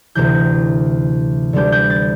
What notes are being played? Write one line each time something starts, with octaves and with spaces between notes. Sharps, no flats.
D2 C3 E3 G6
D2 D3 G3 B3 D4 G6
G6
A6